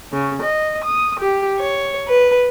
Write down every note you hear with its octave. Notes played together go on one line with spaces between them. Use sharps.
C#3
D#5
D#6
G4
C#5
B4